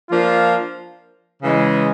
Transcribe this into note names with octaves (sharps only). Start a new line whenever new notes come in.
F3 A#3 D4 F4
C#3 E3 G#3